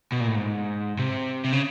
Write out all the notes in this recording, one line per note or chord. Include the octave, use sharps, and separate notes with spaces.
B2
A#2
A2
G#2
C3
C3
C#3